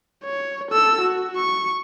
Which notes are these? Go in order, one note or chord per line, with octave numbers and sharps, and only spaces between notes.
C#5
A4 E6
F#4
C#6